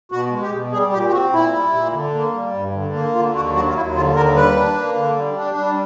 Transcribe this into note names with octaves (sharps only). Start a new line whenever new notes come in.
B2 F#4
G#3
G4
B2
G3 G#4
A#2 G4
G4
C4 F#4
A#2 E4
G3
A#2
D3
A#3
G3
G2
D3
A#3
D3 F4
D#2 F#4
F#3 F#4
F4
D#2 E4
D3 F4
D#2 A#4
G3 B4
D4
A#3
D3
G3
D4
G3